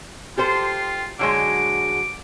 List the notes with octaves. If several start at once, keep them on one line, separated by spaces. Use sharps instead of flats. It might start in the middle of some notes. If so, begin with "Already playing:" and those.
F4 G4 A4 C5
D3 F#3 G#3 D6